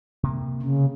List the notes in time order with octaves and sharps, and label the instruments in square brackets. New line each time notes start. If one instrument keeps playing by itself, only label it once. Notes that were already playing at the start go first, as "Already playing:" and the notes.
[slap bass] C3 A#3
[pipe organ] C#3